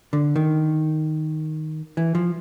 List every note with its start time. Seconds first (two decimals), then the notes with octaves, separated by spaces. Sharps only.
0.13 D3
0.36 D#3
1.97 E3
2.15 F3